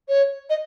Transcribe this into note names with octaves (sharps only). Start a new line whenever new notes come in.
C#5
D#5